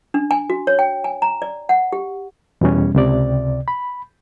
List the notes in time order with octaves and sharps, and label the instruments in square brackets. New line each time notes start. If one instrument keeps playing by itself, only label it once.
[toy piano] D4
G#5
F#4
C#5
G5
G#5
A#5
D5
F#5
G4
[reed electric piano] E2 B2 G3 C#4
C#2 C3 D5
B5